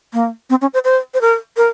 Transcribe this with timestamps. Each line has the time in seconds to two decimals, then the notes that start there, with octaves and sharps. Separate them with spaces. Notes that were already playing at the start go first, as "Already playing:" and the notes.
0.13 A#3
0.50 C4
0.62 C#4
0.74 C5
0.85 C5
1.14 C5
1.21 A#4
1.57 A#4